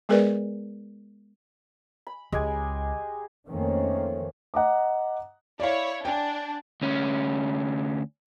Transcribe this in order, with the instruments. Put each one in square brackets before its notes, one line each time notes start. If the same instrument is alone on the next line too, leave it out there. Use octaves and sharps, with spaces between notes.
[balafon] G#3 B3 G#4 A#4 B4 D5
[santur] B5
[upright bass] C#2 [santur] G#3 G4 G#5
[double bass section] F2 D#3 A3 A#3 C4 C#4
[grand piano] D#5 F#5 A#5 D6
[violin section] E4 C#5 [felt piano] D5 F5
[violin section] D4 [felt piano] G5 G#5
[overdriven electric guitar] D2 C#4